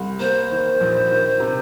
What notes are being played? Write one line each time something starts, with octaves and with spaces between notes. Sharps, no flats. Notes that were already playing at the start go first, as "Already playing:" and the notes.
Already playing: C2
A#3 C5
D#3
A#1
D#3
C3